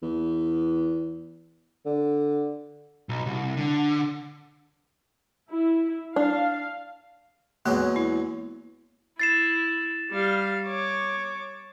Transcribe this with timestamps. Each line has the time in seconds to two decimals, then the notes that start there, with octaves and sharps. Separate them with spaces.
0.02 E2
1.86 D3
3.09 B1
3.26 C2
3.57 D3
5.50 E4
6.16 D4 F5
7.66 E2 F#3 G#3 A#3
7.96 E4
9.20 E4 A6 C7 E7
10.11 G3 F5
10.66 C#5 D6